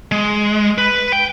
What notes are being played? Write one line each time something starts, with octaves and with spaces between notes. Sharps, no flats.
G#3
B4
G5